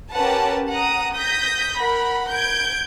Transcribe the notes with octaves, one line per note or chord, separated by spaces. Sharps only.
C#4 G4 A#4 B4 F#5 A5
F#5 A#5 D#6
D#6 G6 A#6 B6
A#4 F#5 B5
G6 G#6 D7